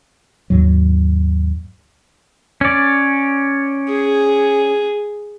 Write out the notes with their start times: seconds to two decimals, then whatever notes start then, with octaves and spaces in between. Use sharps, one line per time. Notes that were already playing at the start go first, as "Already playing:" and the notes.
0.50 D#2 G#2 F#3
2.61 C#4 D5
3.89 G#4